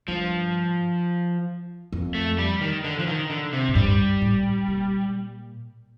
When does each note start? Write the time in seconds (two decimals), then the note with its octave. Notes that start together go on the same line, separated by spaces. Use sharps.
0.08 G2 F3
1.92 F2
2.15 A3
2.38 G3
2.61 D#3
2.84 D3
2.99 F3
3.07 D#3
3.30 D3
3.53 C3
3.68 A2
3.75 G2 G3
4.22 A2
4.68 A#2